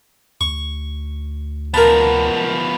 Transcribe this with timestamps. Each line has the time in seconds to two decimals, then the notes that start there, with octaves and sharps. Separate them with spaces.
0.41 D2 C#6
1.74 F3 B3 A#4 A5